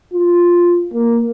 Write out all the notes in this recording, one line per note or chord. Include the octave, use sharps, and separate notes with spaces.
F4
A#3